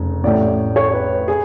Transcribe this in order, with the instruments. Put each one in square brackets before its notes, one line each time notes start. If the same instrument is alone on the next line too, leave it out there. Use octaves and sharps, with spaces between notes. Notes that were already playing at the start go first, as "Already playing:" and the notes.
Already playing: [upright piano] F1 C#3
A1 A2 D5
C#5
B4
G#4